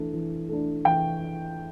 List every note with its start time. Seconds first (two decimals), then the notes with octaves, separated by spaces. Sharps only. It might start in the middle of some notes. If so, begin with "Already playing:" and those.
Already playing: E3 A3 D4
0.14 E3
0.49 A3 D4
0.85 E3 G5